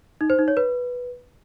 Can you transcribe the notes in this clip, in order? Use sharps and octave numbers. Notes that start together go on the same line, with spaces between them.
D#4
C5
D#4
C#5
B4